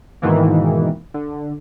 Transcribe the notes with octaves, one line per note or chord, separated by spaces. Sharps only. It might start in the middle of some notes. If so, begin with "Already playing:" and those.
G#2 B2 D#3 E3 A#3
D3